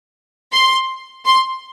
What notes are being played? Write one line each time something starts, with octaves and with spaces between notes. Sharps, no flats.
C6
C6